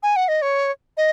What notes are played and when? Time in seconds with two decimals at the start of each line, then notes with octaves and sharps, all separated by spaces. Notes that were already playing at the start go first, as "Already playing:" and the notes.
0.03 G#5
0.16 F#5
0.28 D#5
0.42 C#5
0.97 D#5